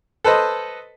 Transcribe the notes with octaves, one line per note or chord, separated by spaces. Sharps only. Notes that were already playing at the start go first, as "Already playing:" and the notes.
A4 B4 C5 D#5